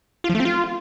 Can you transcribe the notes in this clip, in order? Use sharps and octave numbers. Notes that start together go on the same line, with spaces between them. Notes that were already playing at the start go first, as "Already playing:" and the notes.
F4
F3
A3
C4
F4